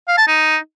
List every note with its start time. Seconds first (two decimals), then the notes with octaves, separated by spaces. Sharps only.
0.08 F5
0.18 A5
0.27 D#4